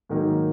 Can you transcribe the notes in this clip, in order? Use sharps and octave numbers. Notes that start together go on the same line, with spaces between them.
G#2 D#3 F#3 A#3 D#4